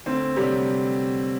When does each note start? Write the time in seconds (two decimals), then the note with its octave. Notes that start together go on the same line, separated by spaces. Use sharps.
0.06 D2 C4
0.36 C3 F#3 G3